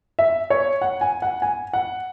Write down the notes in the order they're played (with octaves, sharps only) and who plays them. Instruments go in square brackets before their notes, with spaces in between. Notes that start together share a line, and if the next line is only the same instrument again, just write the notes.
[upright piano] E5
C#5
F#5
G#5
F#5
G#5
F#5